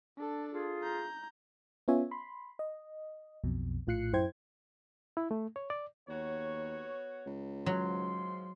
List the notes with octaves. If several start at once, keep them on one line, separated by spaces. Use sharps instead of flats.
D4 A4
F4 G#4
A#5 G6
B3 C#4 F4 C#5 E5 G#5
B5 C6
D#5
B1 F2 B2
A#1 A2 F4 F#6 C7 C#7
F#2 E4 C5 G5 G#6
E4
A3
C#5
D5
D#2 B3 F#4 C#5
C#2
G#2 F3 F#3 C6